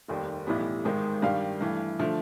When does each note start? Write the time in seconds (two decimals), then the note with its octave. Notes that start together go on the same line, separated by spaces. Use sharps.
0.08 F1 D#2 D#3 G3
0.47 B1 A2 E3 G3 B3
0.85 G#1 G#2 D#3 G#3
1.22 G2 D#3 G3 F5
1.61 G2 E3 A3
1.99 D3 F3 A3